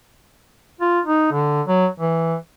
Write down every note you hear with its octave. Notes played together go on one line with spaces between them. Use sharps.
F4
D#4
D3
F#3
E3